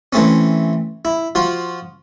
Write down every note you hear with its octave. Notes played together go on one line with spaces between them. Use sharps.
E3 A3 C4 C#4
E4
F3 F4 F#4